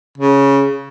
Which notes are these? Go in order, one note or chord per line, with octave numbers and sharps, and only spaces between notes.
C#3